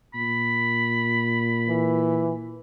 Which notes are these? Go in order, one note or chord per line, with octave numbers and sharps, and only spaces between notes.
A#2 B5
E3